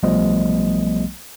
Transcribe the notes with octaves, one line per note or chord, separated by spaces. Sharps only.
B1 F3 G3 A3 B3 D#5